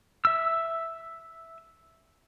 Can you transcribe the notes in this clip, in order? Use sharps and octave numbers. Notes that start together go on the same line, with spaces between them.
E5 E6